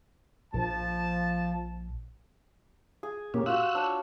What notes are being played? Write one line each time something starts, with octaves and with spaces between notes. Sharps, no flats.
A#1 F3 A5
G#4
A#2 A#3 C#4 G4
F4 F#4 E6 F#6
D4 C#5